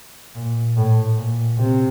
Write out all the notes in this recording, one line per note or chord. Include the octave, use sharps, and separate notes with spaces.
A#2
A2
A#2
C3